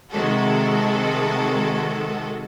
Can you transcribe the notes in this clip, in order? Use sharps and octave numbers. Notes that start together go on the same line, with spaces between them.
C3 D#3 G#3 F#4 A4